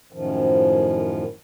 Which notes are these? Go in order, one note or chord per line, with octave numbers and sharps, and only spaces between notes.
F#2 A2 D#3 F3